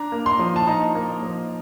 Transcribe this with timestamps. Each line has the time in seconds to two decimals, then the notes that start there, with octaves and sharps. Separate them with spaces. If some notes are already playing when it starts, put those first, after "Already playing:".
Already playing: D4 A#5
0.12 A#3
0.26 C6
0.39 F3
0.56 A5
0.67 D#4 A#5
0.95 A#3
1.23 F3